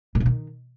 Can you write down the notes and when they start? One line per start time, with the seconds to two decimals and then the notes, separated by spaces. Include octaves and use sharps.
0.15 A#2
0.20 B2
0.26 D#3